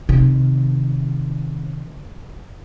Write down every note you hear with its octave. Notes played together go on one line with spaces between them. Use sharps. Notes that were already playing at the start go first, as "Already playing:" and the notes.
C3 D#3